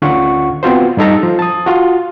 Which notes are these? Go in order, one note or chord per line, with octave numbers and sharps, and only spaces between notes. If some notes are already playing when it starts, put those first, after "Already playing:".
D2 D3 C#4 F4 F#5 C#6
B3 C4 F4 F#4 C5
G2 D#4 A4 A#5
F3
A5 D#6
F4 F#4